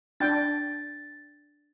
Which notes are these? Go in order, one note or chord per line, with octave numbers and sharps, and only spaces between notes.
D4 G5 A6